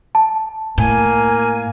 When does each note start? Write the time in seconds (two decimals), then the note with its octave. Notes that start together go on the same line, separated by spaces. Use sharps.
0.15 A5
0.78 A2 A#3 G#5